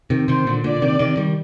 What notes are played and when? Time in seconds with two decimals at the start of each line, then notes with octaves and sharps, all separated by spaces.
0.10 C3 D#3
0.28 C3 D#3 C5
0.47 A#2 D3
0.64 A#2 D3 D5
0.82 C3 D#3
0.99 C3 D#3
1.17 D#3 G3